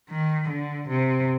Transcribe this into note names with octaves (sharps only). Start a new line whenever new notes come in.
D#3
D3
C3